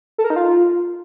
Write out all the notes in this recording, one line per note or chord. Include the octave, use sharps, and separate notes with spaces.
A4
A#4
D#4
F4